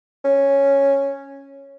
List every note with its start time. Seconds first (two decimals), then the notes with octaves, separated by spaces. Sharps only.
0.25 C#4